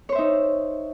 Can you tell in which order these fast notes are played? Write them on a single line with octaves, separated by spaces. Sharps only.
C#5 C5 E5 D#4